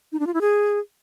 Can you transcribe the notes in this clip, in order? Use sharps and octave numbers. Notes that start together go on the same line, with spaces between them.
D#4
D4
F4
E4
G#4